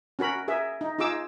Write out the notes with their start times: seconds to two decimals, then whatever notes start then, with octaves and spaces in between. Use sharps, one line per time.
0.19 C#4 F#4 A#4 B5
0.48 G#4 A#4 E5
0.81 D#4
0.99 D#4 F4 G#4 D6 E6